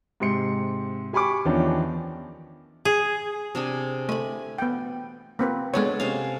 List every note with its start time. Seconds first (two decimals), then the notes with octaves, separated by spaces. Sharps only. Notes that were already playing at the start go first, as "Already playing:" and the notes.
0.20 G#2 C3 C6 C#7
1.13 G4 G#5 B5 C#6 D6
1.45 E2 D#3 F3 C#4 D4
2.85 G#4
3.55 C3 D4 G#4
4.09 A3 G#5 B5
4.59 B3 G5
5.39 A#3 C4 B4
5.74 G#3 B3 D4 A4 C#5
6.00 C3 C#4 F5